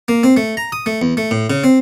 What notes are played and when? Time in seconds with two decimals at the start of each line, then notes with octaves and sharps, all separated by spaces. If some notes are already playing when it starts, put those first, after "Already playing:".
0.08 A#3
0.23 C4
0.37 A3
0.57 A#5
0.72 D#6
0.86 A3
1.02 E2
1.17 A3
1.31 A2
1.50 C#3
1.64 C4